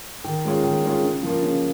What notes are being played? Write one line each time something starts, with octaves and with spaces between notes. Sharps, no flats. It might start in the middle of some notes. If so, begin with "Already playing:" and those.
D#3
G#3 C#4 F4
D#3
G#3 C#4 F4
C#3
F3 A#3 F4
C#3